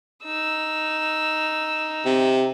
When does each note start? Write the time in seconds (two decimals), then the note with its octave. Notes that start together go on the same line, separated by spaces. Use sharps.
0.24 D#4 E6
2.05 C3